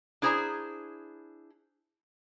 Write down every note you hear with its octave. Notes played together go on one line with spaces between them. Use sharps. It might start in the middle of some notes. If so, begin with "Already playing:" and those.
D4 E4 G#4 C5 A#5